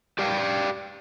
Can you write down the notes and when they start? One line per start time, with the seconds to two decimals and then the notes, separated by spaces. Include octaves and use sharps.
0.19 G4 D5 F5 G5